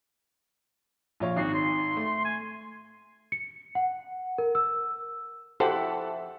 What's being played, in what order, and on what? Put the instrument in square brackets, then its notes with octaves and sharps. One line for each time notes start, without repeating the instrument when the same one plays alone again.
[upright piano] A#1 F4 C#5
[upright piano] G#1 D#4 C7 [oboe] F#4
[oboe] C6
[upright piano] A3
[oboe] G#5
[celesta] C#7
F#5
A#4
E6
[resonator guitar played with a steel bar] F2 E4 F#5 [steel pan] G4 [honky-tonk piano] A4 E5 [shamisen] C5